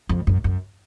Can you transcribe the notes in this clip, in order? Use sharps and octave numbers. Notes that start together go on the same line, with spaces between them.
F2
F#2
F#2